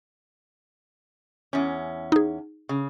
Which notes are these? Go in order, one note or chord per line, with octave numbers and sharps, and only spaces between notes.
E2 C#4
D#4 G#4
C#3